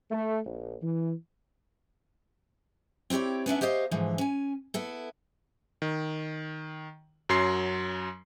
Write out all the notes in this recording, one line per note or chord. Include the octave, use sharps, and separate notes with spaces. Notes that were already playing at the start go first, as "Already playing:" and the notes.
A3
A#1
E3
C4 E4 G4 C#5 D5
B3 C#4 D4 E5
G4 C5 C#5 D#5 F5
G#2 D3 E3 F3
C#4 G#5
B3 E4 A4
D#3
F#2 F#3 C6 C7